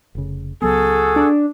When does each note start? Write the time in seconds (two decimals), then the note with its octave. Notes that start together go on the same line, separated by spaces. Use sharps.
0.15 F1 C#3
0.62 C#2 F#3 B3 F#4 G#4 A4
1.16 D4